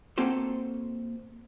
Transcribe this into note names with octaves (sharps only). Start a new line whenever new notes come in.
A#3 C4 F#4 A4 C5